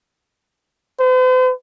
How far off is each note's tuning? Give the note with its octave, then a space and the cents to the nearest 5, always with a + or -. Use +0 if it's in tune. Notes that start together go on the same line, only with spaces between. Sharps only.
C5 -45